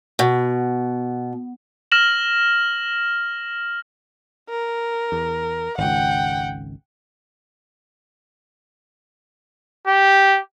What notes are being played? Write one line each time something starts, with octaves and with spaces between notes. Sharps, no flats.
B2
F6 A#6 E7 F#7
A#4
E2
G#1 C#2 F#5 G5
G4